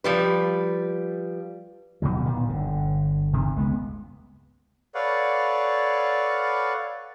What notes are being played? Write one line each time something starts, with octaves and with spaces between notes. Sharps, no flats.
F3 G3 B4
D#1 B2 D#3 F#3
A#2 D#3 B3
G1 D3
G1 G2 C3 D#3
C#2 G#3 B3
A4 B4 C#5 D5 F5 F#5